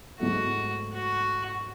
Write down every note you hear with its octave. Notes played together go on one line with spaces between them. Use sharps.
G#2 F#3 A3 F#4
F#4